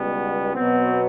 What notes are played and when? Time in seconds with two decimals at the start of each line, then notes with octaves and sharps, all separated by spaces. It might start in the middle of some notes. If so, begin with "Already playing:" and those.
Already playing: C#2 B2 G3 B3
0.54 B2 F#3 B3 C4